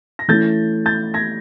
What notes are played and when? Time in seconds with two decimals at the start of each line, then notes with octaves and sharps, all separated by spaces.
0.19 A#6
0.28 E3 A3 C#4 E4 G6 A6
0.86 G6 A6
1.14 G#6 A#6